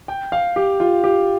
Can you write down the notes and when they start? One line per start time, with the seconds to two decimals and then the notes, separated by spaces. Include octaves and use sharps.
0.08 G5
0.32 F5
0.56 G4
0.80 F4
1.04 G4